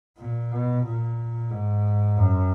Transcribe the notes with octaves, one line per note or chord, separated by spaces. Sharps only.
A#2
B2
A#2
G#2
F#2